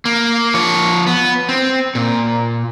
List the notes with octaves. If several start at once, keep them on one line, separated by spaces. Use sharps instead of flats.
A#3
F3 C#5
B3
C4
A#2